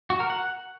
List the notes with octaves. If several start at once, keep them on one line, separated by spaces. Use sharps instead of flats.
F#4
A#4
F#5